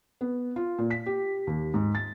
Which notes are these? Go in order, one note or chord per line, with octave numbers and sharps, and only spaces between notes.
B3
F4
A#2
B6
G4
D#2
G#2
A6